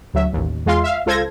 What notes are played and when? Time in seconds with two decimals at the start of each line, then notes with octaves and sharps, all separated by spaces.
0.14 D2 F#3 E5
0.33 A1 D#2
0.66 E2 G#3 F4 F5 C6
0.84 E5 F5
1.06 C#2 F4 A4 C5 G#6 A#6